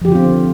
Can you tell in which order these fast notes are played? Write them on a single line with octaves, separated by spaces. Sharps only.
F3 G4 D3 F4 C4